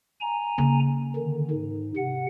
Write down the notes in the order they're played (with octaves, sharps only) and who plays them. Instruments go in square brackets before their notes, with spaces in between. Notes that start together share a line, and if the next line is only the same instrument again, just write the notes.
[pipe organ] G#5 A#5
[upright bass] C#3 A#3
[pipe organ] D3 D#3
G#2
C3 F#5